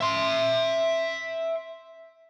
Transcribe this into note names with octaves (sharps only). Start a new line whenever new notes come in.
E5 C6